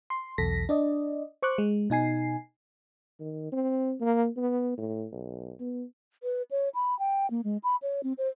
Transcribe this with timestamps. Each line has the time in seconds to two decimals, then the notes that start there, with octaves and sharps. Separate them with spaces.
0.10 C6
0.38 B1 E2 A4 A#6 B6
0.69 D4 D5 D#5
1.42 C5 C#6 D6 F#6
1.58 G#3
1.90 B2 D#4 G#5 C7
3.20 D#3
3.52 C4
4.01 A#3
4.37 B3
4.78 A2
5.12 B1
5.60 B3
6.23 B4
6.51 C#5
6.75 B5
6.99 G5
7.31 A#3
7.44 G#3
7.64 B5
7.82 C#5
8.03 C4
8.18 C5